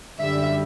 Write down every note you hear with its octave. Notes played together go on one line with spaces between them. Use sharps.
F#2 D3 G3 E5